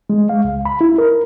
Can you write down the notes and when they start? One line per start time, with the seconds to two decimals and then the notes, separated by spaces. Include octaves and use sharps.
0.10 G#3
0.29 F5
0.44 C#2
0.65 B5
0.81 E4
0.98 A#4